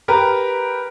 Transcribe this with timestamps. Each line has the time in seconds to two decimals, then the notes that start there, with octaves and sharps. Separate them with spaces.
0.08 G4 A#4 B4 A#5